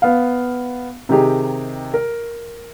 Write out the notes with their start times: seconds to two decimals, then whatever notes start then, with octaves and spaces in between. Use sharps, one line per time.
0.02 B3 F5
1.09 C3 D#3 D#4 G4 G#4
1.94 A#4